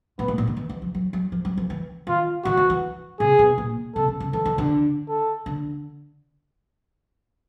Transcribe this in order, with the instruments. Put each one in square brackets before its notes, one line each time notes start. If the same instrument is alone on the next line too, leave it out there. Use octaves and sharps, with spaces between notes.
[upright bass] A#2 [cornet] B3
[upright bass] A2
A#2
D#3
E3
E3
F3
F#3
F#3
F3
F#3
F3
E3
[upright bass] D#3 [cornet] F4
[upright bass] D#3 [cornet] F#4
[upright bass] E3
E3
[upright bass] C3 [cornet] G#4
[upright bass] B2
A#2
[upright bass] C3 [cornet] A4
[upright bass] C#3
C#3
[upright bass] E3 [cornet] A4
[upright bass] D#3
D3
[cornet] A4
[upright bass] D3